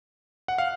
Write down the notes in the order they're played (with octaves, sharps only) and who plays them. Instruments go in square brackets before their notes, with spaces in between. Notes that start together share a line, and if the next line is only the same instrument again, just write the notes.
[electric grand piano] F#5
F5